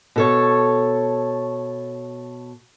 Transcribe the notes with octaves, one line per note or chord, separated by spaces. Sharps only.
B2 A4 C#5